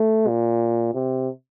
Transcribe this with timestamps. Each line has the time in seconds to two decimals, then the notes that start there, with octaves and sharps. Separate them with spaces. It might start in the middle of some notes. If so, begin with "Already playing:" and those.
Already playing: A3
0.28 A#2
0.94 C3